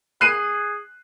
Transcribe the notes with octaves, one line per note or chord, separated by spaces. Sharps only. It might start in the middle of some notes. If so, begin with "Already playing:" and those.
G#4 F#6 C7 D#7